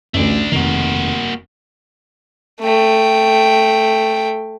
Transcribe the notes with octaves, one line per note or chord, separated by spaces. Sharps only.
A1 D2 A3 D4
F1 D#3 A#3 F#4
A3 G5